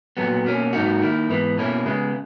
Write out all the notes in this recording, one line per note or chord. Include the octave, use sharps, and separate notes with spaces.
A#2 F#3 B3 F#4
B2 A#3 C#4
G#2 F#3 A#3 D#4 F#4
D#3 A#3 E4
G#2 E3 B3
B2 A#3 C#4 E4
C#3 G#3 B3